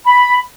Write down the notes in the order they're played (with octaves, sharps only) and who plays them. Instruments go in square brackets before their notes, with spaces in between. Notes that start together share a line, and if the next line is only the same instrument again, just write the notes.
[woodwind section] B5